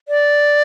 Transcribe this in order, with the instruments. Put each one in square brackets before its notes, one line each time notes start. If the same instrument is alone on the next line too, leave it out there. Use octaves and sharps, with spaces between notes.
[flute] D5